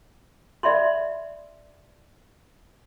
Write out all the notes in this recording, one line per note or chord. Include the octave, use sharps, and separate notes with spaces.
D5 E5 B5 C6